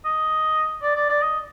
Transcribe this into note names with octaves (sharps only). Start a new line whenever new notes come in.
D#5
D5
D5
D5
D#5